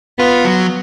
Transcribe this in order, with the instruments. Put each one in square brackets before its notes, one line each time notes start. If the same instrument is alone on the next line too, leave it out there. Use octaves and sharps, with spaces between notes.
[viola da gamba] B3 [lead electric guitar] F4
[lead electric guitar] F#3